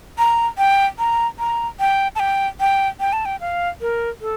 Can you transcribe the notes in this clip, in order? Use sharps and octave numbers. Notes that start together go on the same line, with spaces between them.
A#5
G5
A#5
A#5
G5
A5
G5
G5
G5
A5
G5
F5
A#4
A4